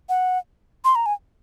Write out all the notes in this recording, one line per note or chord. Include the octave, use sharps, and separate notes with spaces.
F#5
C6
A#5
G#5